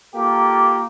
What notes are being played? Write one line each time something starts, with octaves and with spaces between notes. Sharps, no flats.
A#3 F4 G4 A4